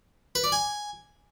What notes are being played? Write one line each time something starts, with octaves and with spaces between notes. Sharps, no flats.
B4
D5
G#5